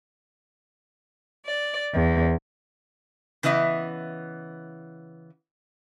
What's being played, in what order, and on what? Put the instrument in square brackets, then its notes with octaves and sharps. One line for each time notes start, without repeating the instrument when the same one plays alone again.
[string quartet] D5
E2
[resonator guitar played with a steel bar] C#3 E3 B3 D#5 E5